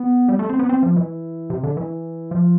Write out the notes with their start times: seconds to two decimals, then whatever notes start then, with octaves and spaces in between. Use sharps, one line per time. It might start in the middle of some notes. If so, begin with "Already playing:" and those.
Already playing: B3
0.29 G3
0.39 A3
0.49 C4
0.59 B3
0.69 C4
0.83 F3
0.96 E3
1.50 C3
1.64 D3
1.77 E3
2.31 F3